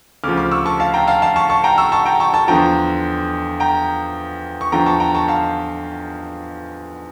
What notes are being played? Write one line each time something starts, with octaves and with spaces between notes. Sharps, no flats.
D2 C#3 F3 D6 F6
D6 F6
C#6 E6
A5 C#6
F5 A5
G5 A#5
F5 A5
F5 A5
A5 C#6
A5 C#6
G5 A#5
C#6 E6
A5 C#6
G5 A#5
A5 C#6
A5 C#6
E2 D3 F3 G5 A#5
G5 A#5
C#6
E2 D3 F3 G5 A#5
A5 C#6
G5 A#5
A5 C#6
F5 A5